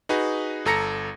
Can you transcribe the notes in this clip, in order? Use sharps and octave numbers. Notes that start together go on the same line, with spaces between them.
D#4 F#4 G#4 B4
G1 A4 A#5 A#6 C#7